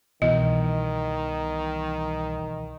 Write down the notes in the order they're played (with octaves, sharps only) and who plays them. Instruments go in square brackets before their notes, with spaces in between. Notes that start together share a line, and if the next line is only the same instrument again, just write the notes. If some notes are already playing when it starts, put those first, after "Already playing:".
[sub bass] C2 [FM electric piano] B2 E3 [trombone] D#3 [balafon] D#5